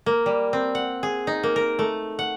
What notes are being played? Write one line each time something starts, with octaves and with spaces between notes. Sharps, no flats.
A#3
G3
C4
F#5
G#4
D#4
A#3
A#4
A3
F#5